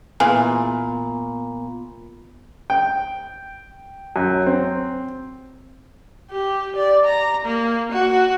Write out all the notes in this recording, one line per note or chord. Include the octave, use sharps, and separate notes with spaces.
A#2 E3 B3 F4 G#4
G5
F#2
C4
G4
D5
A#5
A#3
F#4